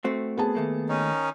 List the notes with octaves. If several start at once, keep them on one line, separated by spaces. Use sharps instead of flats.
A3 C4 F#4
B3 G#4 A5
D#2 A3 A#3
D#3 C#4 D#4